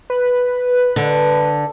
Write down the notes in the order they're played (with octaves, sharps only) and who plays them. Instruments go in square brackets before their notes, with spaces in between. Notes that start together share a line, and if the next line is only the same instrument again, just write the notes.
[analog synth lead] B4
[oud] D3